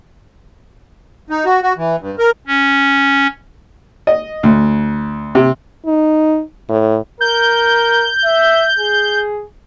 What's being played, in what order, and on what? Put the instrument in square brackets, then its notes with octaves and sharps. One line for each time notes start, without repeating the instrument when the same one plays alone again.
[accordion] D#4
F#4
F#4
E3
G2
A#4
[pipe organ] C#4
[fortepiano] D#5
D2
C3
[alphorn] D#4
A2
[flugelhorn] A#4 [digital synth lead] G6
[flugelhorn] E5
G#4